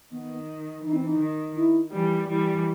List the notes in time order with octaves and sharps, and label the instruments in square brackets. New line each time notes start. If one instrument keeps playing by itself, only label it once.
[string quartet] D#3 [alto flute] B3
[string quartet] E3 [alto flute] D#4
[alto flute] C4
D#4
[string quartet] D#3
[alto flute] E4
[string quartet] E3 G3
[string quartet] E3 G3 [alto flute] E4